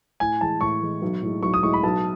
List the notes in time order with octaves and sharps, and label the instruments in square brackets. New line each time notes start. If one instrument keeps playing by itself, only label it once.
[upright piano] A2 [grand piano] G#5
[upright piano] E3 G#3 [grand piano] A5
[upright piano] A2 [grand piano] C#6
[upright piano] E3 G#3
B1
A2 G#3
[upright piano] B1 [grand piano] C#6
[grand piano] D#6
[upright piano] A2 G#3 [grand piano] C#6
[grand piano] B5
[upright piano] B1 [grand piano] A5